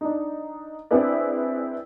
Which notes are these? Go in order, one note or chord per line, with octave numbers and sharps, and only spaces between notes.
D4 D#4
C4 D4 E4 G#4 B4 D5